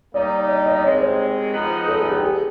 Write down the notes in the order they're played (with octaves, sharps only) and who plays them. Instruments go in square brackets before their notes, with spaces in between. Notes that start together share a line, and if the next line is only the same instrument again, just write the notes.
[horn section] G3 A#3 D#4 [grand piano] D5
[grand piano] D5
D#5
[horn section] C3 D#3 G#3 [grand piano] C#5
[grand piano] C5
[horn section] F3 G#3 B3 D#4
[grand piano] A4
G#4
G4
G#4